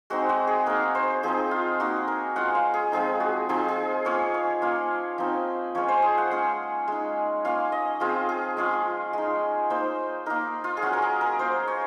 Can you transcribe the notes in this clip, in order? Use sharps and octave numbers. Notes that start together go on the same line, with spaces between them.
G#3 C4 D#4 F#4
F#4
G#4
A#3 D#4 A#4
C5
F3 C4 D#4 G#4
F4
A#3 D#4 F#4
A#4
G#3 C#4 F4 F#5
F5
G#4
F3 G#3 C4 D#4 G#4
F#4
F3 C4 D#4 G#4
G#4
A#3 C#4 F4 C#5
C#5
A#3 C#4 F4
F3 C4 D#4
F3 G#3 C#4 C#5
C5
G#4
F#5
G#3 C#4 F4
G#3 D#4
A#3 C#4 F4 F5
D#5
F3 C4 F4 G#4
G#4
G#3 C#4 F4
G#3 D#4
A#3 D#4 C5
A#3 D#4 A#4
F4
G#4
F#3 C#4 F4 F#4
A#4
G#4
A#4
A#3 F4 C5
C#5